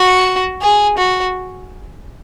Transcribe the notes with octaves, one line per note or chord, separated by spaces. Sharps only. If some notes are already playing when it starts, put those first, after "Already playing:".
Already playing: F#4
G#4
F#4